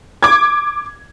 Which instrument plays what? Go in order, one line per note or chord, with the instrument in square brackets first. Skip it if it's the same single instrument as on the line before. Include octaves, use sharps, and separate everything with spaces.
[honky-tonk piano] D6 G#6